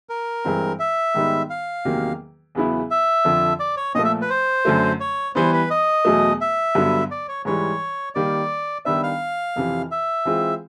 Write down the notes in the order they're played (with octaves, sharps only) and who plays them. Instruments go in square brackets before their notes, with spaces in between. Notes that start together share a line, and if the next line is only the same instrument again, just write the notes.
[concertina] A#4
[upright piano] G2 E3 G#3 C4
[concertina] E5
[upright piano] G#2 D#3 G3 B3 D#4
[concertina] F5
[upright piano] E2 C3 D#3 F#3 A#3
E2 C#3 F#3 B3 E4
[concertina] E5
[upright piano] F2 D3 F3
[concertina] D5
C#5
[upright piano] A#2 F3 A3 [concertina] D#5
[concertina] E5
B4
C5
[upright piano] F#2 D3 F#3 A3
[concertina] C#5
[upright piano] E3 G3 B3 [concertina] C5
[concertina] B4
D#5
[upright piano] E2 B2 F#3 A3
[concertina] E5
[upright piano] G2 D3 F#3 B3
[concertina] D5
C#5
[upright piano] G#2 E3 G3 [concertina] C#5
[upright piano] D#3 G3 A#3 [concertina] D5
[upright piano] D#3 G3 B3 D4 [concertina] E5
[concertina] F5
[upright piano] F2 C3 E3
[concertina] E5
[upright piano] E3 G#3 C4 F4